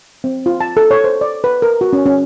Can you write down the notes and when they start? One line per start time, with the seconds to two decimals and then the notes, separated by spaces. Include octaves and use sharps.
0.24 C4
0.46 F4
0.61 A5
0.77 A4
0.91 C#5
1.04 C5
1.21 D5
1.44 B4
1.62 A#4
1.81 F#4
1.93 C#4
2.06 C#4